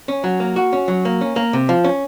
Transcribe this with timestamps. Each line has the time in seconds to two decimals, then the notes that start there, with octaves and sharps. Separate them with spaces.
0.08 C#4
0.24 F#3
0.40 A#3
0.56 F#4
0.73 C#4
0.88 F#3
1.05 A#3
1.21 C#4
1.36 A#3
1.53 C3
1.69 F3
1.84 C#4